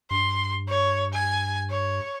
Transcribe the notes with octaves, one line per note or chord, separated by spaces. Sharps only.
G2 C6
C#5
G#5
C#5